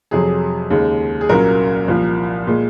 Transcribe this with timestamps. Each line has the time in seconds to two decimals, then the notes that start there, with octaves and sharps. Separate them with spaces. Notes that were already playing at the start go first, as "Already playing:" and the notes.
0.11 F2 C3 F#3 G#4
0.70 D#2 C#3 G#3
1.21 G#4
1.29 C2 A#2 F#3 A#3 C#4 A#4
1.88 C2 A#2 F3
2.47 A#2 G#3